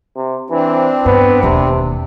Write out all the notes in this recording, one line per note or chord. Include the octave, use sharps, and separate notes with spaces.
C3
E3 C4 D4
G2 B3
E1 D#2 C3